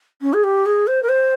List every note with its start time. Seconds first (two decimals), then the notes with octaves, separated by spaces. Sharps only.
0.22 C#4
0.33 G#4
0.44 G4
0.66 G#4
0.87 C5
1.03 A#4
1.09 C5